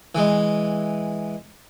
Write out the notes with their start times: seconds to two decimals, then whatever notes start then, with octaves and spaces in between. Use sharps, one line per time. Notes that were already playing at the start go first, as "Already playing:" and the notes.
0.15 E3 G#3